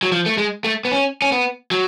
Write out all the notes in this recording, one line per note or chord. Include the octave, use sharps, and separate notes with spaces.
F#3
F3
A3
G#3
A3
B3
C#4
C#4
B3
F#3